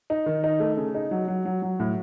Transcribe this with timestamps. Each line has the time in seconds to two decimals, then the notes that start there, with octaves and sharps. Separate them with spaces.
0.10 D#4
0.26 D#3
0.44 D#4
0.60 A3
0.77 C#3
0.95 D#4
1.11 F#3
1.28 F#3
1.45 F#3
1.62 F#3
1.79 A2